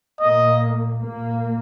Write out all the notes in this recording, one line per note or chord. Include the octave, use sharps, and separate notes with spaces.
A#2 A#3 D#5
A#2 A#3